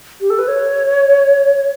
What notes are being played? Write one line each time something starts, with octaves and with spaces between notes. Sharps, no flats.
G4
A4
B4
C#5